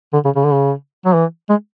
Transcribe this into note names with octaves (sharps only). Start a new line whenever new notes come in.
D3
C#3
C#3
D3
C#3
F#3
E3
G#3